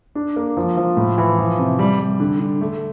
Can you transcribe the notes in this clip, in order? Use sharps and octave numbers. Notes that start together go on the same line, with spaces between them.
D4
A#3
F3
F3
A2
E3
F3
C3
G3
G3
D3
D3
A3